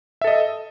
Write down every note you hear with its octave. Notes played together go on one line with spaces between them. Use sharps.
A4 D#5 E5